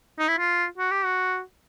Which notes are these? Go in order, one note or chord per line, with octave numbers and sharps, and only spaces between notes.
D#4
E4
F4
F#4
G4
F#4